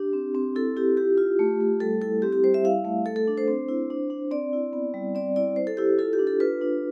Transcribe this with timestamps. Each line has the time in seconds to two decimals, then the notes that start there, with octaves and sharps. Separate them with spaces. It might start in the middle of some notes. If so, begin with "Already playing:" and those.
Already playing: D4 G4
0.13 C4
0.35 C4
0.56 E4 A4
0.77 E4 G4
0.97 F4 G4
1.18 F4
1.39 A3
1.61 A3
1.80 G3 A4
2.01 E4 A4
2.22 C4 G4
2.32 G4
2.44 G3 C5
2.54 E5
2.64 E4 F5
2.85 A3
3.06 A3 A4
3.16 A4
3.28 D4
3.37 C5
3.48 C4
3.68 E4
3.90 D4
4.10 D4
4.31 C4 D5
4.53 E4
4.73 B3
4.94 G3
5.15 C4 D5
5.36 E4 D5
5.56 E4 C5
5.67 A4
5.77 E4 G4
5.98 F4 A4
6.13 G4
6.19 D4
6.27 A4
6.40 F4 B4
6.61 D4